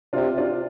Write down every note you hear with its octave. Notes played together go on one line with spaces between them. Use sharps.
C3 D4 F4
D4 F4